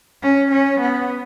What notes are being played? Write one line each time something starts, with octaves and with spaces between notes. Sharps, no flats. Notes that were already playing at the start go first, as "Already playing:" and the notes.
C#4
C#4
B3